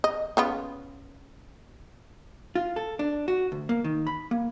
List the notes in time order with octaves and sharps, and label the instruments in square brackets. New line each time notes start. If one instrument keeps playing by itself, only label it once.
[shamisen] D#5
C#3 B3 F4
[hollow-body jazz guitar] F4
A4
D4
F#4
D2
A#3
D#3
B5
A#3